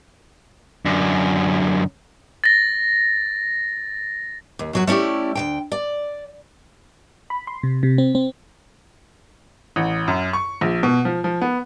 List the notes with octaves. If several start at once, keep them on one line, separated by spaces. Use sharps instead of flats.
F#2 D3
A6 A#6
D#2
F#2 F#3 F#4
A3 C#4 E4 G4 D5
D2 C#3 G5
D5
B5
C6
C3
C3
C4
C4
A1
F#2
C#6
A#1
B2
F3
F3
B3